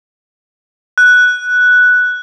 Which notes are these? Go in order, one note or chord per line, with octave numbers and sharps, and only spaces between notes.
F#6